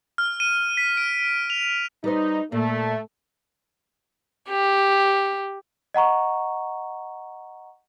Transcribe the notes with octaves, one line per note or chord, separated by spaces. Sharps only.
F6
D#7
B6
D7
F7
G3 D#4 B4 C5
A#2 A3
G4
D#5 F#5 A#5 C#6